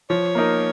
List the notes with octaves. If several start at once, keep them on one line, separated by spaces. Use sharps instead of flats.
F3 C#5
A#3 D#4 A#4